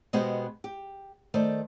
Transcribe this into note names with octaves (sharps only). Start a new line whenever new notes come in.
B2 G#3 B3 F#4 G4 C5
G4
D#3 A3 C5 D5